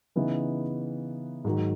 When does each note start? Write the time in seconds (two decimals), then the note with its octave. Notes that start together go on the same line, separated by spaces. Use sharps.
0.15 C#3 E3 B3 D#4
1.45 G#2 D#3 F#3